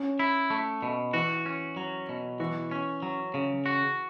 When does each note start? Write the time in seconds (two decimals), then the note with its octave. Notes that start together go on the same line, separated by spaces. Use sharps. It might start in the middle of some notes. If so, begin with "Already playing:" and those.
Already playing: C#4
0.19 E4
0.50 A3
0.82 B2
1.13 E3 F#4
1.46 C#4
1.77 F#3
2.09 B2
2.40 E3 F#4
2.71 C#4
3.02 F#3
3.34 C#3
3.66 F#4